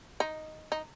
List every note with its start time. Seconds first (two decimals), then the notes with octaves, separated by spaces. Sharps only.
0.20 D#4
0.72 D#4